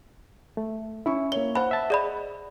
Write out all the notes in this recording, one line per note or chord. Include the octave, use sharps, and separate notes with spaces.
A3
C#4 E4 C#6
A#3 C#5 G7
C5 F#5 B5
E5 A5
G#4 D5 D#5 B5